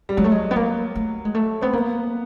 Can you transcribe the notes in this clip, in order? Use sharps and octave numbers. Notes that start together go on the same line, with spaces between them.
G3
F#3 G#3
A3
G#3
B3
A#3
A3
G#3
A3
B3 C4
A#3 B3